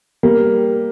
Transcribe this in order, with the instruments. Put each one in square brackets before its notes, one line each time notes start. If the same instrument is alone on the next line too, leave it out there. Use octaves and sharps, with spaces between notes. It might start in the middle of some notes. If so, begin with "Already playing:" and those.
[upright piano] G3 A#3